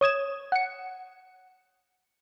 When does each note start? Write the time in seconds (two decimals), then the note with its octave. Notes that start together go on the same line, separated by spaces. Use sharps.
0.01 C#5 D#6 G#6 E7
0.52 F#5 C#7